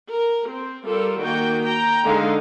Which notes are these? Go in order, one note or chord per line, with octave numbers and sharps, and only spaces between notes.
A#4
C4
G3 F4 A4 A#4
D#3 A#3 F#4 G5
G5 A#5
D3 G#3 D#4 F5